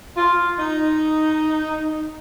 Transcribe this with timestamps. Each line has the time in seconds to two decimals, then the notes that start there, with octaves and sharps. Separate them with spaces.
0.15 F4
0.58 D#4